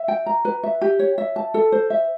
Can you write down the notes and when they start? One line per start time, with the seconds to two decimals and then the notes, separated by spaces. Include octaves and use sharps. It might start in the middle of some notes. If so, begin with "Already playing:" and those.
Already playing: E5
0.08 G5
0.26 A#5
0.45 B4
0.63 E5
0.81 G4
0.99 C#5
1.18 E5
1.36 A5
1.54 A4
1.72 C5
1.90 E5